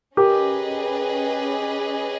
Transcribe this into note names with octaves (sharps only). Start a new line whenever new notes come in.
C#4 G4 G#4 A#4 B4 D#5